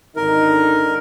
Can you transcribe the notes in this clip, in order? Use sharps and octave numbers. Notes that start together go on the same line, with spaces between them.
G#1 D3 D#4 A#4